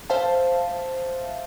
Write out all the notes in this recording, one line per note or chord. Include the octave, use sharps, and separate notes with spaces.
C5 E5 F5 A5